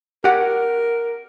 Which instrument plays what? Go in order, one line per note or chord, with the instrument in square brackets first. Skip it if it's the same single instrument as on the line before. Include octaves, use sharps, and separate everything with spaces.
[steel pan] G4 F#5 [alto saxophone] A#4